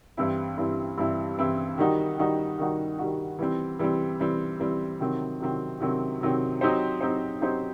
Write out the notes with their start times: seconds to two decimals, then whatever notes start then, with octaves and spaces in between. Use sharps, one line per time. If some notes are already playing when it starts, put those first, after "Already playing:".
0.17 G2 E3 G3 C4 E4
0.57 G2 E3 G3 C4 E4
0.98 G2 E3 G3 C4 E4
1.38 G2 E3 G3 C4 E4
1.78 D#3 G3 D#4 F#4
2.18 D#3 G3 D#4 F#4
2.58 D#3 G3 D#4 F#4
2.99 D#3 G3 D#4 F#4
3.39 E3 G3 C4
3.79 E3 G3 C4
4.20 E3 G3 C4
4.60 E3 G3 C4
5.00 C3 D#3 F#3 C4
5.40 C3 D#3 F#3 C4
5.80 C3 D#3 F#3 C4
6.21 C3 D#3 F#3 C4
6.61 F#3 C4 D#4 G4 C5
7.01 F#3 C4 D#4 G4 C5
7.41 F#3 C4 D#4 G4 C5